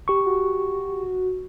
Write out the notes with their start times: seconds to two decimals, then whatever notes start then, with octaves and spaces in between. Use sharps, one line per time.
0.08 G4 C#6
0.26 F#4